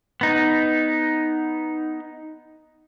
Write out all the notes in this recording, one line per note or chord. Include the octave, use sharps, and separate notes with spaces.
B3 D#4